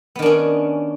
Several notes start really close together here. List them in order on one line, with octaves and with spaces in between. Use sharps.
B3 D#3 D4 C#4